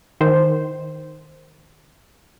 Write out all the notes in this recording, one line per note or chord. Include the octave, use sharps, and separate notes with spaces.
D#3 C5